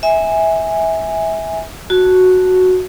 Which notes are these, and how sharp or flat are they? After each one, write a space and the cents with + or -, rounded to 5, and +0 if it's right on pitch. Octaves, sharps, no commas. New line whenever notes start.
E5 -20 G#5 -10
F#4 +0 A5 +0